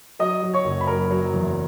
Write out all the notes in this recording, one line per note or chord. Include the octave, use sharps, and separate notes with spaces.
F#3 D#5 D#6
F#3
C#5 C#6
F#1
B5
F#3 A#4 A#5
F#3
E2